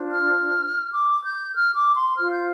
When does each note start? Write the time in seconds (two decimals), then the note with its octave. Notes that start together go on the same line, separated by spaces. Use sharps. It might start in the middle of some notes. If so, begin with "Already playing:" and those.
Already playing: D4 F4 C5
0.11 F6
0.92 D6
1.23 G6
1.54 F6
1.75 D6
1.95 C6
2.16 F4 C5 F6
2.31 G6